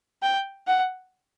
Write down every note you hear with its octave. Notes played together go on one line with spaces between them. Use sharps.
G5
F#5